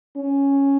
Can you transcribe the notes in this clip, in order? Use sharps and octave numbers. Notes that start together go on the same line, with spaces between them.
C#4